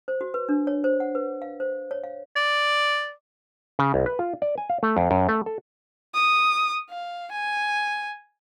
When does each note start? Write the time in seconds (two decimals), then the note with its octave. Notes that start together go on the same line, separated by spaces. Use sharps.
0.08 C5
0.21 F#4
0.34 B4
0.49 D4
0.67 C#5
0.84 C5
1.00 F#5
1.15 B4
1.42 F5
1.60 C5
1.91 C#5
2.04 F5
2.36 D5
3.79 C#3
3.94 C2
4.06 B4
4.19 F4
4.42 D5
4.58 G#5
4.70 F5
4.83 A3
4.97 F2
5.11 F#2
5.29 A3
5.46 A4
6.15 D#6
6.90 F5
7.32 G#5